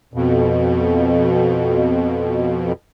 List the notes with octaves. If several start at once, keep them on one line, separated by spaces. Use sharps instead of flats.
F2 B2